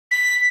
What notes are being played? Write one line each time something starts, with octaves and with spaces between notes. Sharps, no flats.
B6